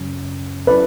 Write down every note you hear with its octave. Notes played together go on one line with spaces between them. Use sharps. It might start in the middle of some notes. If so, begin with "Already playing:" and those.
Already playing: F#2 C#3 F#3 C#4
F#3 C#4 E4 A4 B4 D5